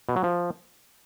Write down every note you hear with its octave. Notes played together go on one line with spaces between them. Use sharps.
B2
F#3
F3